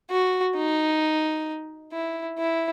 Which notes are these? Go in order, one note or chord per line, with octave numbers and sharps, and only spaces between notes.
F#4
D#4
E4
E4